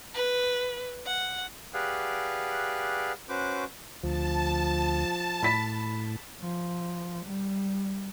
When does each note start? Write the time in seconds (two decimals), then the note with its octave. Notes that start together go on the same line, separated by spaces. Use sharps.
0.14 B4
1.06 F#5
1.74 G4 G#4 B4 D5 F5 F#5
3.29 C#4 F#4 B4 C5 D6
4.03 D2 F3 A5
5.42 A2 B5 B6
6.42 F3
7.25 G3